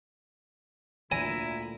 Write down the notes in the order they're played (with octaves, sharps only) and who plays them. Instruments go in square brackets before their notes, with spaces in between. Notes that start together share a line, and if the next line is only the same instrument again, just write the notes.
[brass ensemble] D2 A#2 D3 [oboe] E4 [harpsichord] G#5 [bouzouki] A#5